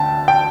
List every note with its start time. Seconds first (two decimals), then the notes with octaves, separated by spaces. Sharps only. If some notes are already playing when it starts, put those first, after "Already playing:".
Already playing: D2 D3 G5 A5
0.28 G5